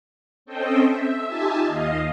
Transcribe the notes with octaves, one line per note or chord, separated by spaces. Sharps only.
C4 C#4 A4 C5 D#5 G5
E5
D#4 F4 G4 E5 G#5 A5
D#2 D#5 F5